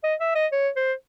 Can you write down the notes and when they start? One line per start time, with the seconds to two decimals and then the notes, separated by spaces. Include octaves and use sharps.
0.04 D#5
0.20 E5
0.35 D#5
0.52 C#5
0.76 C5